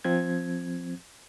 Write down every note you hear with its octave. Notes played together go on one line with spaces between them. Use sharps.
F3 C4 G#6